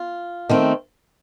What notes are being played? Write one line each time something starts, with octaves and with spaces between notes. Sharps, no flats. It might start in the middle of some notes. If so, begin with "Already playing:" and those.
Already playing: F4
D#3 A3 C4